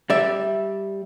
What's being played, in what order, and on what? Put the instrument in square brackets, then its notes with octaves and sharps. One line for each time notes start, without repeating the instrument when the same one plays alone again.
[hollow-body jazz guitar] G3 D5 E5